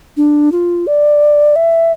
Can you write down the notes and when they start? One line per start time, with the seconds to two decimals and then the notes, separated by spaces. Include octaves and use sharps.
0.17 D4
0.52 F4
0.87 D5
1.56 E5